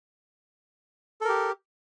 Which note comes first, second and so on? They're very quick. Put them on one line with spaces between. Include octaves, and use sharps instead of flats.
A4 A#4 G4